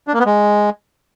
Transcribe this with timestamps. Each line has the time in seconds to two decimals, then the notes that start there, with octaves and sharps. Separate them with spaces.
0.07 D4
0.14 A#3
0.20 B3
0.26 G#3